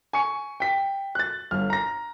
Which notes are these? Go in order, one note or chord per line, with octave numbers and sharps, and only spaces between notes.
G#5 C#6 C#7
G5 B6
F#6 A6
G1 F6
A#5 A#6